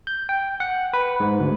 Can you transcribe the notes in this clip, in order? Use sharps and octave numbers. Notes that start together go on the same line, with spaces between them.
G6
G5
F#5
B4
G#2
D2